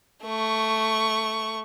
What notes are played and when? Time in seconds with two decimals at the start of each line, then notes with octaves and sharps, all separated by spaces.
0.25 A3 C#6